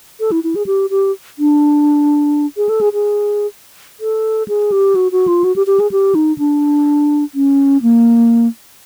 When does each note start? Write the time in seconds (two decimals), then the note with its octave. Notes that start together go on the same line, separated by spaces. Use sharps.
0.20 A4
0.32 E4
0.44 E4
0.55 G#4
0.66 G4
0.90 G4
1.39 D4
2.57 G#4
2.69 A4
2.81 G#4
2.93 G#4
4.00 A4
4.48 G#4
4.72 G4
4.95 F#4
5.12 F#4
5.28 F4
5.44 F#4
5.56 G4
5.67 G4
5.80 G#4
5.92 G4
6.15 D#4
6.38 D4
7.35 C#4
7.82 A#3